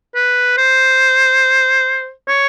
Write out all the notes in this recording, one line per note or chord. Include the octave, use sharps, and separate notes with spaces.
B4
C5
C#5